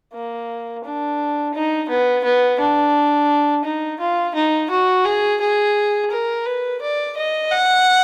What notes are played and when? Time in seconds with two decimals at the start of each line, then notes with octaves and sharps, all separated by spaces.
0.13 A#3
0.84 D4
1.54 D#4
1.89 B3
2.24 B3
2.59 D4
3.65 D#4
4.00 F4
4.35 D#4
4.70 F#4
5.05 G#4
5.41 G#4
6.11 A#4
6.46 B4
6.81 D5
7.17 D#5
7.51 F#5